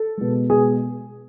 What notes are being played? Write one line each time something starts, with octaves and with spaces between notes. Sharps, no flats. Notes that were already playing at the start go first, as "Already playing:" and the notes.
Already playing: A4
B2 G#3
B2 G#3 G#4